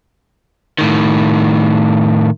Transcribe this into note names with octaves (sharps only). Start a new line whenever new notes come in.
A2 D#3